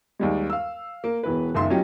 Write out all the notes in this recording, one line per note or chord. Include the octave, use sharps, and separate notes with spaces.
D#2 G3 G#3
F5 E6
A#3
E1 E3 B4
F#1 C#2 D#3 E5 C6
F#3 C#4 D#4 F4 G4